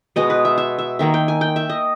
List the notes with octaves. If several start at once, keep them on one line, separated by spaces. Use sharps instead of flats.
B2 G#3 B3 D#5
B4
E5
E5
E5
D#3 A#3 E5
G5
G#5
G5
E5
D#5